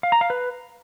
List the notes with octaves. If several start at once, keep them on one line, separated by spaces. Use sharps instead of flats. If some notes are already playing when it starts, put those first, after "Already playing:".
F5
A#5
F5
B4